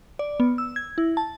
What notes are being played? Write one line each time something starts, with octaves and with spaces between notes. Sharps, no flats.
D5
B3
E6
G#6
E4
A5